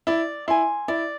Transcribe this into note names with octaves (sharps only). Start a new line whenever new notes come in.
E4 D5
E4 G#5 C6
E4 D5